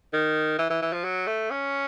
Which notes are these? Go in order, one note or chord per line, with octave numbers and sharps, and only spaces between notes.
D#3
E3
E3
E3
F3
F#3
A3
C#4